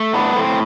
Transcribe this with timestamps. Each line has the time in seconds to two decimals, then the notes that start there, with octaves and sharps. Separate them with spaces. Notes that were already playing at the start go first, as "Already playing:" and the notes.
Already playing: A3
0.14 A2 B3 D4
0.36 A2 C4